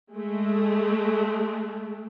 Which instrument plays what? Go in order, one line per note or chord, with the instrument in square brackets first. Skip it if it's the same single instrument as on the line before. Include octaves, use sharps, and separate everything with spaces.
[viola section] G#3 A3